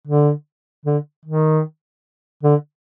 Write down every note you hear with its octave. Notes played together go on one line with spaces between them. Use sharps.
D3
D3
D#3
D3